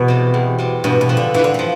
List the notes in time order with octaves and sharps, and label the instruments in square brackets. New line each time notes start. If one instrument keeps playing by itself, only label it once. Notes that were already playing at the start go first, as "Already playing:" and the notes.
Already playing: [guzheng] E2 [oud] B2
[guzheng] C3 G3
E2
C3 G3
[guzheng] G2 [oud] B2
[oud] B2
[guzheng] F3 B3
[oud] D3
[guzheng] G2 [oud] E3
[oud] D3
[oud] E3 [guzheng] F3